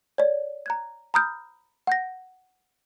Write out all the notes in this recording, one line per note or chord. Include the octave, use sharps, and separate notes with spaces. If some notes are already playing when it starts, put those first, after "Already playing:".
C#5 D5
A#5 F#6 G#6
A#5 B5 D#6 F6 G6
F#5 G6 A#6